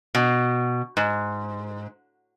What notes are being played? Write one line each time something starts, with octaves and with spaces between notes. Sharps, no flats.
B2
G#2